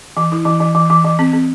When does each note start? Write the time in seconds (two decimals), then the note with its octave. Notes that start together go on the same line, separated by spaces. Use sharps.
0.17 E3
0.32 E4
0.45 E3
0.60 E3
0.75 E3
0.90 E3
1.04 E3
1.19 C4
1.33 C4